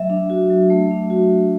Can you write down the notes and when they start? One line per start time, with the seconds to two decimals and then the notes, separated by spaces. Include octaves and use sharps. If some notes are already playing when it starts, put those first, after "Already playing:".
Already playing: F#3 A3 E5
0.10 D4
0.30 F#4
0.50 F#3
0.70 A3
0.91 D4
1.10 F#4
1.30 A3